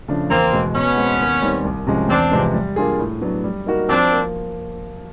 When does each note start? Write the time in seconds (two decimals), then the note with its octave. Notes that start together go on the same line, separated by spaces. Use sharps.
0.08 C#3 F3 A3 D4
0.30 E2 A#3 C4
0.52 B2 G#3
0.74 B2 B3 C#4
0.97 G#3 C4
1.20 D#2
1.42 D#3 G3 C4
1.64 C2
1.87 C3 F3 G#3 C#4
2.09 E2 C4 D4
2.31 C3 F3 G#3 B3
2.54 G3
2.76 A#3 D4 F4 G#4
2.99 A2
3.21 F#3 B3 D4
3.44 G3
3.66 A#3 D#4 F#4 A#4
3.88 F3 C4 D4
4.11 A#3